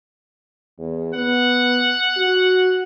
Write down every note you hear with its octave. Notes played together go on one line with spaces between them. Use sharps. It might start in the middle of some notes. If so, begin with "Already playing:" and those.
E2
B3 F#5
F#4